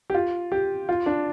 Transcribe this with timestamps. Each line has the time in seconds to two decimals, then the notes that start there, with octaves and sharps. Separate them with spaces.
0.10 G4
0.14 F4
0.52 G4
0.89 F4
1.06 D4